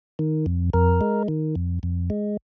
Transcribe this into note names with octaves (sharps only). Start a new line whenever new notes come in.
D#3
F2
F2 A#4
G#3
D#3
F2
F2
G#3